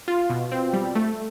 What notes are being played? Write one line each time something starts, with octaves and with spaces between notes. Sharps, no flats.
F4
B2
C4
G3
A3